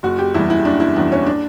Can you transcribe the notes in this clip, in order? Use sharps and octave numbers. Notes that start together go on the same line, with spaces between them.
F#1 F#4
G4
E2 B2 G3 E4
E4
F#1 D4
E4
E2 B2 G3 D4
C#4
D4